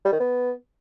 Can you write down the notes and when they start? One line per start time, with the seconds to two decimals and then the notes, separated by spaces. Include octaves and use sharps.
0.05 G3
0.12 D#3
0.20 B3